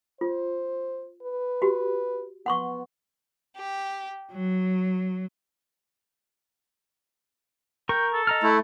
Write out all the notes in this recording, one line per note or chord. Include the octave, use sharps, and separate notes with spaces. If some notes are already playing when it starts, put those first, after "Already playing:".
F4 C5
B4
F#4 G4
B3 F#5 C6 C#6
G4
F#3
A#4 G5 C#6
A4
D#5 A#5 F6
A3 E4